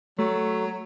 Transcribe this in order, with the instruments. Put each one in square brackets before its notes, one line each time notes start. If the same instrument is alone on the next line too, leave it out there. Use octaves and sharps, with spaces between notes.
[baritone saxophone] F#3 [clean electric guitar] A3